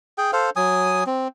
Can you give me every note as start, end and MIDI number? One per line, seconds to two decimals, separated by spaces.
0.18 0.31 68
0.18 0.31 79
0.33 0.50 69
0.33 0.50 72
0.33 0.50 77
0.56 1.04 54
0.56 1.04 80
0.56 1.04 87
1.06 1.28 60